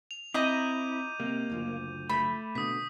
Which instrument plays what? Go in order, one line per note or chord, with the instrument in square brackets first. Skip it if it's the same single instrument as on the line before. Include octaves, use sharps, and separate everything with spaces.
[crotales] F7
[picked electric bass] C4 [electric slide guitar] E4 [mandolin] D#5 A#5 [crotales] D6 G6 D#7
[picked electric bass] C3 [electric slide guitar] A#3
[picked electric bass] F#1 D2 F3
[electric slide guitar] A3 [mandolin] B5
[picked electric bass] B2 D3 [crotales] D#6 B6